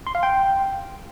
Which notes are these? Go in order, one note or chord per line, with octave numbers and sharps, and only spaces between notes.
C6
F5
G5